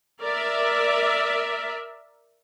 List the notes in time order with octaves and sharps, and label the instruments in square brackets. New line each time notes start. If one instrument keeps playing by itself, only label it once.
[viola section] A#4 D5 E5